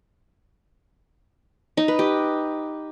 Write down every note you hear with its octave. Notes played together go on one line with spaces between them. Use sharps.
D#4
B4
G4